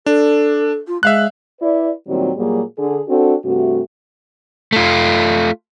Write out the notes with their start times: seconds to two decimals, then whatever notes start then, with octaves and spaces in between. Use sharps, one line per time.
0.06 D4 A4
0.87 F4
1.03 G#3 E5 F5 F#6
1.61 E4 B4 D5
2.07 A#2 D#3 F#3 G3 C4
2.37 A#2 F#3 G3 A#3 G#4
2.78 D3 G#4
3.08 C4 D4 F#4 A4
3.45 G2 C3 A3 F#4
4.72 A3 F4